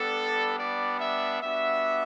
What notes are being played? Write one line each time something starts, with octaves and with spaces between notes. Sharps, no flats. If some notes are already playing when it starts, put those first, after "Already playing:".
Already playing: G3 B3 D4 A4
D5
E5
G3 B3 D4 F#4 E5